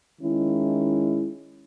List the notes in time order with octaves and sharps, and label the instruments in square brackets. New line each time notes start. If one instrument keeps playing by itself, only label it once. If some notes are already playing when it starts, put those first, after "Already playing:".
[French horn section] D#3 G#3 C#4 E4